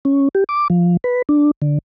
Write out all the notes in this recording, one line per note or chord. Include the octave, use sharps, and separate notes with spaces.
C#4
G4
D6
F3
B4
D4
D3